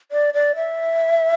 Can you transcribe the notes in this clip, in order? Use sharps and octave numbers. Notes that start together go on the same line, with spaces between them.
D5
D5
E5